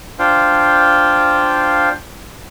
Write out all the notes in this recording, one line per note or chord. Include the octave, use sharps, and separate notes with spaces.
D4 F4 C5 F5 G5